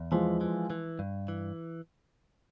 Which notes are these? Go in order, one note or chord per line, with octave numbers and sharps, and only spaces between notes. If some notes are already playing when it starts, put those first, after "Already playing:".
Already playing: E2
E3 F3 G#3
E3
E3
G2
E3